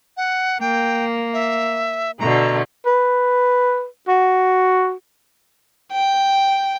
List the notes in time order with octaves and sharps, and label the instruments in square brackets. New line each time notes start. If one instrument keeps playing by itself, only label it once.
[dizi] F#5
[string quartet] A#3 [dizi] G5
[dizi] E5
[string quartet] B2 D3 A3 [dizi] A#5
[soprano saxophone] B4
F#4
[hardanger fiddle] G5